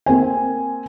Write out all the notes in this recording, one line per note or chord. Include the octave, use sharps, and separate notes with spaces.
A#3 C4 C5 G#5